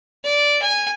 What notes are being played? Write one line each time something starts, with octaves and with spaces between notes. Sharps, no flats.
D5
G#5